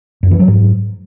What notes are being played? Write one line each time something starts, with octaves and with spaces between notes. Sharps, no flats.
F#2
E3
F#3
G#2